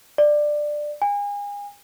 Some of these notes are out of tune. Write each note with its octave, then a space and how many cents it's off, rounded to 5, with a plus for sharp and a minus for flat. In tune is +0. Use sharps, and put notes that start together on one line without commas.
D5 +15
G#5 -35